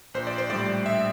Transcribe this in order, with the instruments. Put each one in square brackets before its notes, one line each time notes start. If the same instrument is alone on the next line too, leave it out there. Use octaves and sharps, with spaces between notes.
[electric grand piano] A#1 C5
D5
C5
A2 G3 D5
A#1 E5